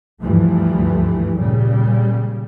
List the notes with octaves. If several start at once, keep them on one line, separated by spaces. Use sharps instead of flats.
D2 G2 E3 F3 A3
A#2 C#3 G3